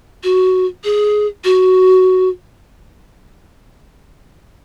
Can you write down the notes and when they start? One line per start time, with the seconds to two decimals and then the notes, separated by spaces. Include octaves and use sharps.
0.24 F#4
0.84 G#4
1.44 F#4